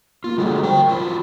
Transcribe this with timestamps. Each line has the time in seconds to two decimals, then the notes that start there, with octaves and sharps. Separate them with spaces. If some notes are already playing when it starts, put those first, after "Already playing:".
0.24 A#3 F4
0.38 D3 G3 G#3 F#4
0.63 A#4 C5 G5
0.89 F#3 F4 B5